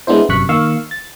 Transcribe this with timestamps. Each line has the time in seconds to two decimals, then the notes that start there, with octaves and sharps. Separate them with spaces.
0.07 G#3 B3 D4 E4 C5
0.29 G1 F#2 C3 C#6 F#6 B6
0.49 D#3 A#3 F5 C#6 E6
0.91 A6